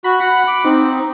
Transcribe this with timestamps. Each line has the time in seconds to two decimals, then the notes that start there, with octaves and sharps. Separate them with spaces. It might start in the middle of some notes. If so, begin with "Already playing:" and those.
0.04 F#4 B5
0.20 F#5 B5
0.47 D6
0.65 C4 D#4